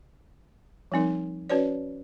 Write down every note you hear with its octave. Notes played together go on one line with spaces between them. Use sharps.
F3 G3 C4 D#4 A#4
C#4 F#4 B4 C#5 D5